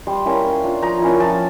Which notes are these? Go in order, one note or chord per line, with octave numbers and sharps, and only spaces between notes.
G3 C6
A#3 C#4 E4
A#3
D4 F4
F3 A#5
A#3 C#4 E4
F3 A5